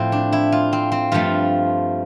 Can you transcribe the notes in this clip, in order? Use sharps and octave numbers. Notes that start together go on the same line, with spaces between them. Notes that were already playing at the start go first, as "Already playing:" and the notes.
Already playing: A2 F3 A3 C4
D4
E4
F4
C4
C4
G2 F3 A3 F4